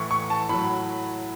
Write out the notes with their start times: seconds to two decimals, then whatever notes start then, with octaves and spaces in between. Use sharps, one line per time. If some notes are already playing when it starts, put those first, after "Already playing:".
Already playing: A2 E3 C#6
0.11 C#6
0.30 A5
0.49 A2 F#3 B5